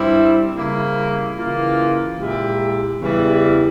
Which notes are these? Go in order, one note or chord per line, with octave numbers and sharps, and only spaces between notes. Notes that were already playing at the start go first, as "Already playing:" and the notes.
Already playing: G2 G3 C4 E4
C#3 G3 A#3 E4
C#3 E3 A#3 F4
A#2 G#3 E4 G4
E2 C#3 E3 G3